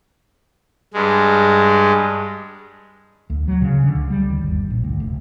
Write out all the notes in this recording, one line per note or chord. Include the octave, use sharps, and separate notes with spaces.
G2 G#3
D2
F#3
C#3
D3
C#2
G3
D#2
G1
A#1
D2
F1